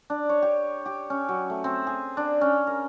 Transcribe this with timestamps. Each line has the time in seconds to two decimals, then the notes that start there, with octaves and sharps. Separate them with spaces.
0.10 D4
0.29 C#5
0.42 G4
0.86 G4
1.10 C#4
1.29 F#3
1.50 A3
1.64 C4
1.87 G#4
2.17 D4
2.41 C#4
2.67 A#4